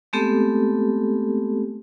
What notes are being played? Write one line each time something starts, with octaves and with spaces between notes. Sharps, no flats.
G#3 A3 B3 C4 G4 A4